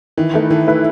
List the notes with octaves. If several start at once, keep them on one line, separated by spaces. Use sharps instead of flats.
D#3 E3
D#3 A3 E4 B4
D#3 E3
A3 E4 B4